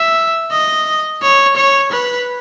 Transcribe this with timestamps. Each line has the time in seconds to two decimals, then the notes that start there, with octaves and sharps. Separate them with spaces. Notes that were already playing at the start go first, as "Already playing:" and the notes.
Already playing: E5
0.52 D#5
1.22 C#5
1.56 C#5
1.92 B4